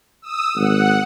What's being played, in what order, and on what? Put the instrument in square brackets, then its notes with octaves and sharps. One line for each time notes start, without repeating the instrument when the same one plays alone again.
[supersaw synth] D#6 E6
[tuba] G#1 [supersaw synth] F#5